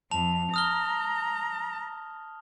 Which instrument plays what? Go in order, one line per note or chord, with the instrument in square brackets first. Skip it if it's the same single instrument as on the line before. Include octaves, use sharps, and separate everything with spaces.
[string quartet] F2 [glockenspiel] A5 F7
[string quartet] A#5 [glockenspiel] D#6 F6 G7